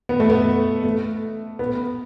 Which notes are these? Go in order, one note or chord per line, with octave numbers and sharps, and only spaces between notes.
B3
A3
B3
A3
B3